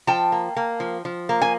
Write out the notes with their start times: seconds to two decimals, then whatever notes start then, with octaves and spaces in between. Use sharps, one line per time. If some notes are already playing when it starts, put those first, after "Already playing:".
0.07 F3 G5 A5
0.32 A#3
0.57 A#3
0.80 F3
1.05 F3
1.29 A#3
1.42 G#5